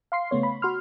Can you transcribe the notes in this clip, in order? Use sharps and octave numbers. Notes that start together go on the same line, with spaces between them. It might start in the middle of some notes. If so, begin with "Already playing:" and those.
F5 C6 C7
C#3 A3 B3 C#5
B5
F#4 C6 F6